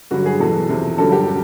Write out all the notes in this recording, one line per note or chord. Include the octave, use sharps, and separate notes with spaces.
G2 D3 F#3 F#4
G#4
E2 B2 F#3 A4
E2 C3 F3
G2 D3 F#3 A4
G4